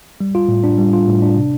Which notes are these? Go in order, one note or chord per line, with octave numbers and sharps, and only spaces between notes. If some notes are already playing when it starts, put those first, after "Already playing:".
G3
F4
A2
D4
G3
F4
A2
D4
C3